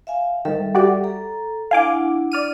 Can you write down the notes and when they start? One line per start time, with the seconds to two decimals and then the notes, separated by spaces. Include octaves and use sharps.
0.07 E5 F5 G#5
0.45 G#2 D#3 G3 A4 E5
0.75 F#4 G4 D5
1.04 A4 A#5
1.71 D4 E4 F5 F#5 G#5 D6
2.32 D5 F6 D#7